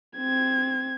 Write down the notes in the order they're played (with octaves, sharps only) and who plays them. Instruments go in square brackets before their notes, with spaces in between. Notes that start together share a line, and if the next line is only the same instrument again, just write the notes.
[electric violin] C4 G#6